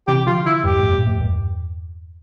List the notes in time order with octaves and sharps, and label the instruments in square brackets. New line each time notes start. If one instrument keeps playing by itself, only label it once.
[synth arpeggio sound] C3 E3 [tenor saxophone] G4
[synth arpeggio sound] D3 F3 [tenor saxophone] F4
[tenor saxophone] E4
[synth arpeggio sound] E2 G2 [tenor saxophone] G4
[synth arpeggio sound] F2 A2
G2 A#2
F2 A2
E2 G2